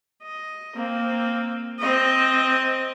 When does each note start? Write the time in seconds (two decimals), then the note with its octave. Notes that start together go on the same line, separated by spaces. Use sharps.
0.23 D#5
0.76 A#3 C4
1.80 C4 D#5